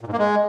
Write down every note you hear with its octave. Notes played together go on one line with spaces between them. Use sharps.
A#2
G#2
A#3
G#3